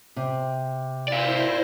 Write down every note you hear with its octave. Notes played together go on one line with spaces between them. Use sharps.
C3
E4 C5 D5 F5